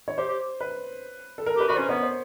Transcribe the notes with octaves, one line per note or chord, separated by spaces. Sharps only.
C#5
G4 C5
G4
B4
A4
A#4
G4 B4
F#4 B4
C#4 C5
B3 C#5
C5